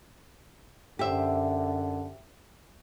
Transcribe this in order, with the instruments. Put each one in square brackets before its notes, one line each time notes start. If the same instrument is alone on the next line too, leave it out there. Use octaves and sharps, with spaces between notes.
[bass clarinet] F#2 [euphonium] D3 [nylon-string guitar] G4 C5 E5